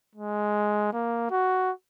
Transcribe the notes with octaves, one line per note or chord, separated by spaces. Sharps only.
G#3
A#3
F#4